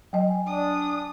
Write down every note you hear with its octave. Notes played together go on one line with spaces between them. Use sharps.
F#3 D#5 G5 G#5
D4 D#6